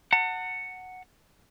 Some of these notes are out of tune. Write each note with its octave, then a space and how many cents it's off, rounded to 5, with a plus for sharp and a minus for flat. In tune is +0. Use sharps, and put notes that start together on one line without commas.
F#5 +0 A5 +40